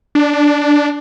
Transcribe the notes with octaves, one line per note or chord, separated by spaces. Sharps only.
D4